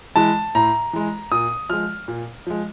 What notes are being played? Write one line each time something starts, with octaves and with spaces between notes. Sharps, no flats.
E3 G#3 A5
A2 A#5
E3 G#3
A#2 D#6
F3 G#3 F6
A#2
F3 G#3